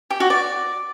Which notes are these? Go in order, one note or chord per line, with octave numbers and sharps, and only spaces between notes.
G4
F#4
D5